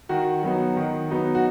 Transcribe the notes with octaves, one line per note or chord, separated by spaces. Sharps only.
D#3 F#4
F#3 B3 D#4
D#3
F#3 B3 D#4
F#4